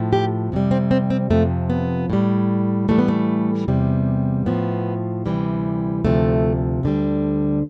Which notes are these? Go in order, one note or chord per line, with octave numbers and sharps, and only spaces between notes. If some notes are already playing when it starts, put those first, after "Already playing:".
Already playing: A2 F3
G4
F2 C3 G3
C4
C4
C4
F2 C3 F3 A3
B3
A2 G3
A2 E3 G3 A3
B3
A3
E2 C3 G3
A2 F3 B3
D2 C3 E3 G3
D2 C3 F3 A3
D2 D3 G3